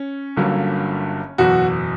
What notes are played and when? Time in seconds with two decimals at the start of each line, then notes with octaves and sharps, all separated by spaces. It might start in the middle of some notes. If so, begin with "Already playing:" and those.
Already playing: C#4
0.36 G1 G2 D3 F#3 A#3
1.38 F#1 E2 B2 F#4